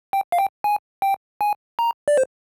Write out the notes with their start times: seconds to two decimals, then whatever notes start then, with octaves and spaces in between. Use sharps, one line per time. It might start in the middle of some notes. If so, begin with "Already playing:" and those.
0.13 G5
0.32 F5
0.39 G5
0.64 G#5
1.02 G5
1.41 G#5
1.79 A#5
2.08 D5
2.17 C5